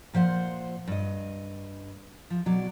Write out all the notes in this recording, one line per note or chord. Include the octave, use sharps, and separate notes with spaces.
A#2 F3 C5 F#5
G2 D#5
F3
B2 F#3 D5